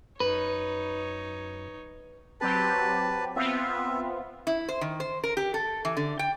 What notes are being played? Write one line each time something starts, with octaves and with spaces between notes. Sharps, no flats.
F#2 D#4 B4 C#5
F#3 C4 G4 B4 A5
B3 C4 F4 E5
E4
C5
D#3
C5
A#4
G4
A4
E3
D3
G5